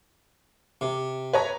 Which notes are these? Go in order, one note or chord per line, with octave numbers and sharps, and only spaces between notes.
C3
B4 C#5 A#5